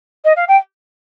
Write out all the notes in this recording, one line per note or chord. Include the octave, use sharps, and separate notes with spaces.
D#5
F5
G5